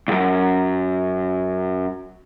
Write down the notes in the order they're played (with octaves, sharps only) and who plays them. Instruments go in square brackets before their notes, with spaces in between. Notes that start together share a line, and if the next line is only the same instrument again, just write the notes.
[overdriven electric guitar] C#2 F#2